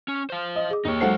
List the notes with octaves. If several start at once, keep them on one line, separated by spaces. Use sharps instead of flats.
C#4
C5 F5
D#5
G#4 D6
D#2 D#4 C#5
F#3 G#3 A4 C5 F#5 C7